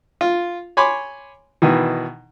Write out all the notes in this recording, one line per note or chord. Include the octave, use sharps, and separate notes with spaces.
F4
C#5 G#5 B5 C6 D6
B2 D#3 E3